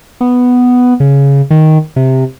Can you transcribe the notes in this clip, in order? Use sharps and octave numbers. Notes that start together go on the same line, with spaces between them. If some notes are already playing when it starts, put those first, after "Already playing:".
B3
C#3
D#3
C3